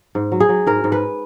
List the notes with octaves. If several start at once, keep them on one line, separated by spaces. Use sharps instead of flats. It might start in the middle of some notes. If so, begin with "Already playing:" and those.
G#2
F#3
G#4
F#3
G#2 A#4
G#2
B4